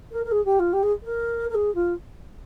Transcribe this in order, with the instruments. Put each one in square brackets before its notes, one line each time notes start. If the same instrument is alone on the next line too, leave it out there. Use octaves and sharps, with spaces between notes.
[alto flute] A#4
A#4
G#4
G4
F4
G4
G#4
A#4
A#4
G#4
F4